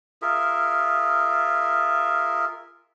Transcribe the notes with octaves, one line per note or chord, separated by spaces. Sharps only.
F4 G#4 A#4 E5